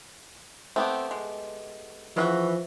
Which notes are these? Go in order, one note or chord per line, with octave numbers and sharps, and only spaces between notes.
A3 B3 C4 G4
G#3
C#3 E3 F3 F4 F#4